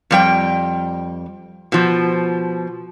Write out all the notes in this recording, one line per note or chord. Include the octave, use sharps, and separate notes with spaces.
F2 G3 G5
B2 F3